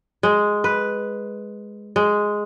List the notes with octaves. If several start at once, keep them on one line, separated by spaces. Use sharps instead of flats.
G#3
B4
G#3